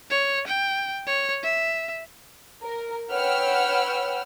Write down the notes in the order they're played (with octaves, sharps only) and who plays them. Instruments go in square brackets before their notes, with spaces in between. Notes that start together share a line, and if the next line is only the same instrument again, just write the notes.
[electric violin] C#5
G5
C#5
E5
[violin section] A#4
B4 C#5 F#5 G5 E6 F6